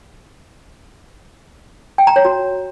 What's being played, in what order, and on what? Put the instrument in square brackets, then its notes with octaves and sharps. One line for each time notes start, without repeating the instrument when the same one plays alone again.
[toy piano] G5
A#5
C#5
F#4